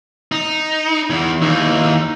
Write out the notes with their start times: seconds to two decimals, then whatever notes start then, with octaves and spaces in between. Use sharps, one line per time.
0.32 D#4
1.10 E2
1.42 D#2 E3 D#4